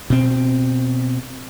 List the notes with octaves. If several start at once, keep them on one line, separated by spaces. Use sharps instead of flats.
B2 C4